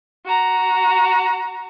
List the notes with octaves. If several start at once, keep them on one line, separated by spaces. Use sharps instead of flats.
F#4 A#5